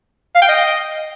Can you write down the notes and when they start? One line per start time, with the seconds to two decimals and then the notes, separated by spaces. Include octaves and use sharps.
0.35 F5
0.42 G5
0.48 D#5